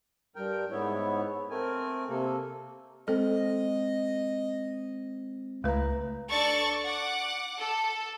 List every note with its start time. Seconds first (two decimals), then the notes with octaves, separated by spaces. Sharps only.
0.36 G2 A#4 G5
0.71 G#2 B3 E4 C#5
1.50 A3 C4 A#4 G#5
2.09 C3 A#3 A4
3.08 G#3 C4 A4 D#5
5.64 C#2 A3 E4 B4 A#5
6.30 D4 A4 D5 C#6 A6
6.84 F#5 D6
7.59 A4